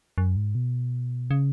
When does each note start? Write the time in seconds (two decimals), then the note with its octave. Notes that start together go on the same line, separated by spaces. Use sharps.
0.18 F#2
0.36 G#2
0.55 B2
1.31 C#3